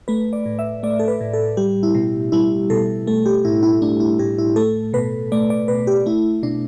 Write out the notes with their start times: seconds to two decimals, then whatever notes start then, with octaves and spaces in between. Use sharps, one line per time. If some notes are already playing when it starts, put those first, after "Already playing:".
0.08 A3 B4
0.33 D5
0.46 A2
0.59 E5
0.83 A3 D5
0.99 A4
1.08 B4
1.21 A2
1.33 A4
1.57 G3 G4
1.83 E4
1.95 B2
2.32 G3 E4
2.70 B2 A4
3.07 A3 A4
3.26 G4
3.45 A2 E4
3.63 E4
3.82 A3 D4
4.00 E4
4.19 A2 G4
4.38 E4
4.56 A3 A4
4.93 B2 B4
5.32 A3 D5
5.50 D5
5.68 B2 B4
5.87 G4
6.06 A3 E4
6.43 B2 D4